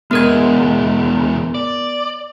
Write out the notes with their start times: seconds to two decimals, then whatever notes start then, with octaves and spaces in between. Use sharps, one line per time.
0.11 E2 G#3 B3 A#4 G#6
1.55 D5